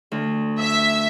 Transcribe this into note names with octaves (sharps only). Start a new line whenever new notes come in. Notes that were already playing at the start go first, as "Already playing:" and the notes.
D2
E5